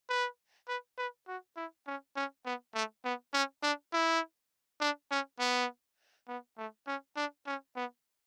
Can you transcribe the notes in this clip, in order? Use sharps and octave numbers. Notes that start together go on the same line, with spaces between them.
B4
B4
B4
F#4
E4
C#4
C#4
B3
A3
B3
C#4
D4
E4
D4
C#4
B3
B3
A3
C#4
D4
C#4
B3